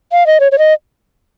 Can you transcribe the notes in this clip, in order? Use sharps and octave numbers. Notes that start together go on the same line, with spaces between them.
F5
D#5
C#5
C#5
D#5